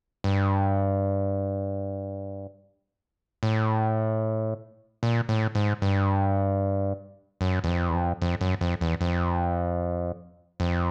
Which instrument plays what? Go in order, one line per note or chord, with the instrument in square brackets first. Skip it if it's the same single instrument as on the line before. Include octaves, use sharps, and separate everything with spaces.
[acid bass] G2
A2
A#2
A2
G#2
G2
F#2
E2
F2
E2
F2
F2
F#2
F2
E2
F2
F2